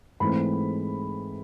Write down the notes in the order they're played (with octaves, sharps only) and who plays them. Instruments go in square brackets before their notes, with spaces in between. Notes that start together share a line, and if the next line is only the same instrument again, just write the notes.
[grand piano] G#2 E3 A3 C4 B5